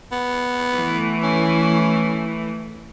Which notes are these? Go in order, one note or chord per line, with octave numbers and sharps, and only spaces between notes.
B3
E3 A3
C#4